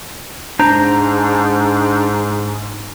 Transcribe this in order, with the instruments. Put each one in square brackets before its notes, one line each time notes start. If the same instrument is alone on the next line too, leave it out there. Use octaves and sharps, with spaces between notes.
[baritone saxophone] G#2 [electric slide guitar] D4 C5 A#5